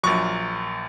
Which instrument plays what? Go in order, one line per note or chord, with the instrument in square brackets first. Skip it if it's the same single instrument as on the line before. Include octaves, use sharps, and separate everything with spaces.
[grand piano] A#1 A#2 F#3 C#6